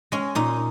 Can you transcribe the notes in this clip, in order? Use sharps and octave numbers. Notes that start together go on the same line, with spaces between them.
G#3 C#4
A#2 D#4